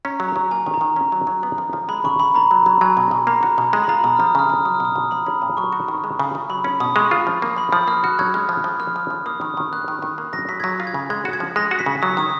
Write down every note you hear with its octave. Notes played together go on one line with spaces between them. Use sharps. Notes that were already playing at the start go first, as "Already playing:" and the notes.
C#4 A#5
F#3
A#5
F#3
A#3 G#5
D#3
A#5
D#3
C#4
F#3
F#3
B3
F3
F3
G#3 B5
C#3 C#6
C#3 B5
A#3 A#5
F#3
F#3
F#3 G#5
B2
B2
A#3 A#5
F#4
B2
G#3
B5
F4 A#5
B2 D#6
F3 F6
D#6
C#3 F6
C#3 D#6
F#3 D#6
F6
B2 D#6
B2
F3 B5
C#4
A#2
F#3 C#6
F#4
D#3
G#3
C#3
C#3
F#3 B5
C#4
B2 D#6
G#3 C#6
F4
F3
A#3
F3 B5
F3 D#6
A#3 F6
F#4 F#6
F#3 G#6
G#3 F6
F3
F3
A#3 F6
F3
F3
A#3 D#6
D#3 D#6
D#3
A#3 F#6
D#3
D#3
A#3
F#3 A#6
F#3 B6
G#6
F#3 A#6
F4
G#6
C#3
G#3 G#6
F#4
G#6
F3
G#3 A#6
F#4
B6
C#3
F#3 D#6
D#3 D#6